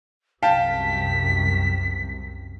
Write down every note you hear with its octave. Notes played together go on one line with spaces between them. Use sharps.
C2 F#2 C3 F5 G5 A5 B6